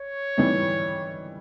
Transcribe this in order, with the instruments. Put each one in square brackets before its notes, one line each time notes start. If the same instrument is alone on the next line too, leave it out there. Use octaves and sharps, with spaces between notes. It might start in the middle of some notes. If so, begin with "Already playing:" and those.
Already playing: [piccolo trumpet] C#5
[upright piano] E3 G3 B3 D#4